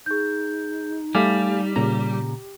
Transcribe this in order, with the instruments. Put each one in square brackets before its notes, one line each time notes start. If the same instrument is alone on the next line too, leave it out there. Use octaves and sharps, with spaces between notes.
[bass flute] D#4 [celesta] G#4 G6
[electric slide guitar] G3 [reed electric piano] A3 F5 G#5 [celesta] D6
[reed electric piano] A#2 C#3 A#5 [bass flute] G4